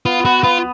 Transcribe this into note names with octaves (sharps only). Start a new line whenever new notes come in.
B3 F4
B3 F#4
B3 F4